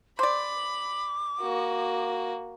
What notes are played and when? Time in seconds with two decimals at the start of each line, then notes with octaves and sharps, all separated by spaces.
0.19 C5 D5 B5 D6
1.40 A#3 F#4